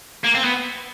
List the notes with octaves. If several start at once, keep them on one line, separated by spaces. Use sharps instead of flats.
A#3
C4
B3